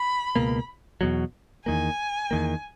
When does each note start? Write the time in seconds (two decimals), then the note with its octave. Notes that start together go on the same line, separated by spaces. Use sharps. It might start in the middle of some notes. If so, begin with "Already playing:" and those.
Already playing: B5
0.36 C#2 B2 A#3
1.01 E2 B2 F#3
1.66 E2 D#3 A#3 G#5
2.31 E2 D#3 A#3